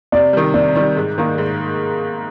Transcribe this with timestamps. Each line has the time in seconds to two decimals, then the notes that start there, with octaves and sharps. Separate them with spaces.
0.12 C3 D5
0.33 D#3 G3
0.54 C3 D5
0.75 D#3 G3
0.96 G#2
1.18 D#3 A#3
1.38 G#2